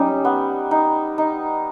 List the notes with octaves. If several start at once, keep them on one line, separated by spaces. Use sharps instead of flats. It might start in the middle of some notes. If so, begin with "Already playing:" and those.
Already playing: G3 C#4 D#4
B3
D#4
D#4